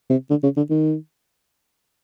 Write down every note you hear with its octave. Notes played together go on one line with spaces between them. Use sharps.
C3
D3
C#3
D3
D#3